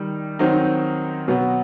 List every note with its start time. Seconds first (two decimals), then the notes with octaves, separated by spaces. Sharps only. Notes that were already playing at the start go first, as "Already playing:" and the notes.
Already playing: D#3 G3 D#4
0.39 D#3 F#3 C4 D#4
1.28 B2 F#3 B3